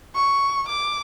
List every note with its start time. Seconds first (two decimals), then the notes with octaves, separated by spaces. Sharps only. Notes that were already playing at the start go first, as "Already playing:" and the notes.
0.15 C#6
0.68 D6